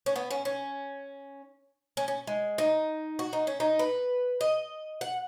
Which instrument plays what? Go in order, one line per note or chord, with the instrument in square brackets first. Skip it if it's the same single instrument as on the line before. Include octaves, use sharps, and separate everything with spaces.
[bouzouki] C#4
B3
C#4
C#4
C#4
C#4
G#3
D#4
F#4
D#4
C#4
D#4
B4
D#5
F#5